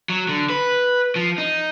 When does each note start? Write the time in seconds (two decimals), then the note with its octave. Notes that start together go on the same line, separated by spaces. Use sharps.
0.09 F#3
0.29 D3
0.50 B4
1.16 F3
1.38 D#4